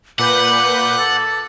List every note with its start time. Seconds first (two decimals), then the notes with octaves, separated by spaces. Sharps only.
0.19 A#2 B4 F#5 D6 G6
0.99 A4